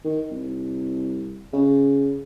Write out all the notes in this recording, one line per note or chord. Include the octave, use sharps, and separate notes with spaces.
D#3
C2
C#3